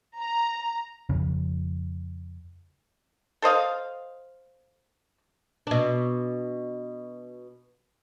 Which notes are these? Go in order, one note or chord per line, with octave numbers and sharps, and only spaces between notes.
A#5
F2 C#3 C#4
A4 C5 D#5 F5
B2 D4